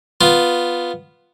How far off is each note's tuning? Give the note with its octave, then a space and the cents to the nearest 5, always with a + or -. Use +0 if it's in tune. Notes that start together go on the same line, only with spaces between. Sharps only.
B3 +0 F4 +0